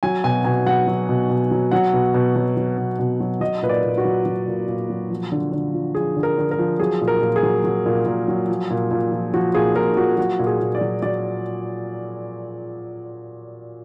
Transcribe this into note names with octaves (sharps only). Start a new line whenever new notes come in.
F#3 G#5
B2 G#5
B2 G#5
F#3 F#5
F#3
B2
B2
F#3
F#3 F#5
B2
B2
F#3
F#3
B2
B2
F#3
F#3 D#5
A#2 B4
D5
A#2
F#4
F#3
F#3
A#2
A#2
F#3
F3
D3
D3
F3
F3 G#4
D3
A#4
D3
A#4
F3
F#3 G#4
A#2
A#4
A#2
G#4
F#3
F#3
A#2
A#2
F#3
F3
A#2
A#2
F3
F3 F#4
A#2 G#4
A#2 A#4
F3 F#4
F#3 F#4
A#2
G#4
A#2
D5
F#3
F#3 D5